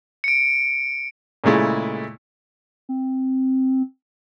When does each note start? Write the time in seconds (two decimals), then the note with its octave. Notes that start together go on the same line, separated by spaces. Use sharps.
0.24 C#7 D7
1.44 A#2 C#3 G#3 A3 E4
2.89 C4